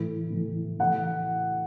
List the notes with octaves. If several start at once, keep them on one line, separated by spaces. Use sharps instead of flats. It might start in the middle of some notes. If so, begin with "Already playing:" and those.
Already playing: A2 E3
A2 E3
A2 E3 F#5